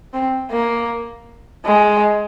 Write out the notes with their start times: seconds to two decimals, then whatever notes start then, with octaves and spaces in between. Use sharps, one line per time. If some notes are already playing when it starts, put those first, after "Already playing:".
0.14 C4
0.51 A#3
1.66 G#3